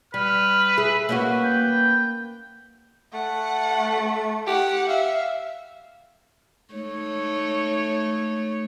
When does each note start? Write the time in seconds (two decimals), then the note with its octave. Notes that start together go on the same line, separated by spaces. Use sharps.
0.14 G3 B4 F6
0.78 G#4 E5
1.09 A#3 C#4 F#4 B4
1.44 G5
3.14 A3 F#5
4.47 G4 F#5
4.89 E5 F5
6.74 A3 D#4 C#5